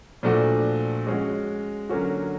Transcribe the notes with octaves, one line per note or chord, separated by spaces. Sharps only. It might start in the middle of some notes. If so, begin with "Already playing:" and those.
A#2 F3 A3 D4 F#4
G#3 C#4 F#4
D3 F#3 A#3 C#4 F#4